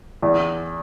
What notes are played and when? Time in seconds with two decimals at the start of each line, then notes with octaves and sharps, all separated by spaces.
0.22 E2